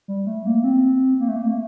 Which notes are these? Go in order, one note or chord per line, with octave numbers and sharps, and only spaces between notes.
G3
A3
A#3
C4
A#3
A3
A#3
A3